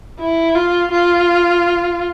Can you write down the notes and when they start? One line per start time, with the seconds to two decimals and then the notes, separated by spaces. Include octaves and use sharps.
0.20 E4
0.55 F4
0.92 F4